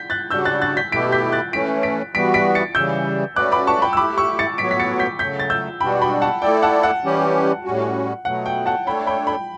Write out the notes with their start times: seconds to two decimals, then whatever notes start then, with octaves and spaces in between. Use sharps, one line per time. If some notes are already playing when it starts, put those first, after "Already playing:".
Already playing: G6 B6
0.10 F#6 A6
0.30 C#3 G3 D4 F#4 E6 G6
0.45 F#6 A6
0.62 F#6 A6
0.77 G6 B6
0.91 B2 A3 E4 G4 B6 D7
1.12 G6 B6
1.32 F#6 A6
1.52 E3 A3 C#4 B6 D7
1.83 B6 D7
2.15 E3 G3 B3 F#4 B6 D7
2.34 B6 D7
2.55 A6 C#7
2.75 C#3 E3 G3 E6 G6
3.36 A3 C#4 F#4 B4 D5 D6 F#6
3.52 B5 D6
3.67 A5 C#6
3.82 G5 B5
3.93 E6
3.97 A3 E4 G4 B5 D6
4.18 C#6 E6
4.39 A6 C#7
4.58 A2 F#3 B3 F#4 C#5 B6 D7
4.71 B6
4.80 A6 C#7
4.99 G6 B6
5.19 C#3 F#3 A3 G6 B6
5.39 A6
5.50 E6 G6
5.80 B2 G3 D4 F#4 G5 B5
6.02 G5 B5
6.22 F#5 A5
6.42 A3 E4 A4 D5 G5
6.63 F#5 A5
6.83 F#5
7.04 E3 G3 C#4 G4
7.64 A2 G3 C#4 F#4
8.25 B2 F#3 A3 F#5
8.46 G5
8.66 F#5 A5
8.86 A3 D4 A4 C#5 G5 B5
9.07 G5 B5
9.27 G5 B5